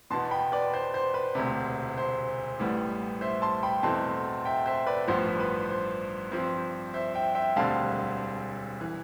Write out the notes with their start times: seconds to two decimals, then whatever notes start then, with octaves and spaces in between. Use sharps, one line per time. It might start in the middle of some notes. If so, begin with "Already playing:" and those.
0.10 E2 B2 B3 A5 C6
0.31 G5 B5
0.52 B4 D5
0.74 C5
0.94 C5
1.14 B4
1.35 E1 D2 C3
1.98 C5
2.60 A1 A2 G3 B3
3.21 C5 E5
3.42 A5 C6
3.63 G5 B5
3.83 E2 B2 A3 C4 A5 C6
4.45 E5 G5
4.66 C5 E5
4.87 B4 D5
5.07 A1 G2 F3 B3 C5
5.39 B4
5.70 C5
6.32 G2 F3 C4
6.94 C5 E5
7.14 E5 G5
7.35 E5 G5
7.56 E1 D2 D3 G3 C4 F5 A5
8.81 E3